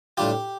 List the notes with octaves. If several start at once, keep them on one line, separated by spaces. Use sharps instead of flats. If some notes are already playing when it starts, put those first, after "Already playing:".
A2 G3 D4 F4 G4